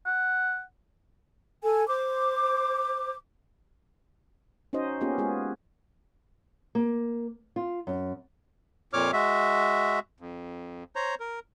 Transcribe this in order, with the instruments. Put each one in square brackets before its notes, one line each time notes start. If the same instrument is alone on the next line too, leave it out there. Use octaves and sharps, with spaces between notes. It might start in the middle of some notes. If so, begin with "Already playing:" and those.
[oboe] F#5
[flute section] A4 G#5
C5 D6
[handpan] C#4 D#4 F#4 C5 D#5
A#3 B3 C#4 F4 G4 G#4
G#3 B3 F4 G#4
[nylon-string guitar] A#3
F4
F#2
[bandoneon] F2 A#2 C#5 D6 F6
G#3 F#4 E5
F2
C5 C#5 A#5
A#4